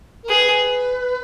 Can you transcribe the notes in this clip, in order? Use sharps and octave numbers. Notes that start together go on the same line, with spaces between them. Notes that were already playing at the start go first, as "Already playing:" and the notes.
A#4
G#4 B4